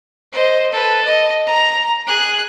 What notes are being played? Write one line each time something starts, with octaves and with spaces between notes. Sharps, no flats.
C5 D#5
A4 B4
D#5
A#5
G#4 F#6